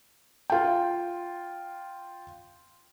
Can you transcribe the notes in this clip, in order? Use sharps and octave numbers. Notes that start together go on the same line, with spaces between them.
F4 G5